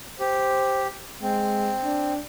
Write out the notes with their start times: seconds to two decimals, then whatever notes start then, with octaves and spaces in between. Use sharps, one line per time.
0.20 G4 C5
1.22 G#3 C4
1.83 D4